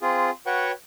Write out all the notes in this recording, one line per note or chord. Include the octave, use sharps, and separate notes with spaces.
C4 F4 G#4
F#4 B4 C#5 F#5 G5 C#6